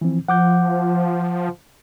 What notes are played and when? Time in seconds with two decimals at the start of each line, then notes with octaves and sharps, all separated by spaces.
0.01 E3 F3 C4
0.28 F3 F#5 D6 G6